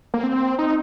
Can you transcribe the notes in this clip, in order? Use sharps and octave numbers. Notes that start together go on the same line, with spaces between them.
A#3
C4
D#4